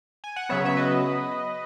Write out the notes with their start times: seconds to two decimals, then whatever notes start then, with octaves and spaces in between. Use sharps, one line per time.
0.24 G#5
0.36 F#5
0.49 C#3 F#3 B3 C#5 E5
0.65 E5
0.77 B4 D#5